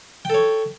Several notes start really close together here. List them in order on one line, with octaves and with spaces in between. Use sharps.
G5 A4 C#5